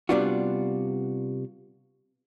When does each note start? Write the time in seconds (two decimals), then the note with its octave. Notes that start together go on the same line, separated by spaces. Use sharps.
0.09 C3 G3 B3 D4 F4 F#4